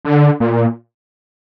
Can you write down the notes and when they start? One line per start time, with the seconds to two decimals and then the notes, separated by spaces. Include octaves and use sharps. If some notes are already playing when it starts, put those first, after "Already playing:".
0.05 D3
0.40 A#2